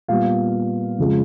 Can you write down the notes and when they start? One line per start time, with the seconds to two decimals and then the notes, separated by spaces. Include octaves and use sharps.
0.08 A#2 G3 B3 F5
0.98 F2 C#3 F3 G#3